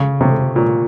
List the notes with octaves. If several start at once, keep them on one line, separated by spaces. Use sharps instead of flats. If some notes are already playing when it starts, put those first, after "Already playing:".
Already playing: C#3
C3
A#2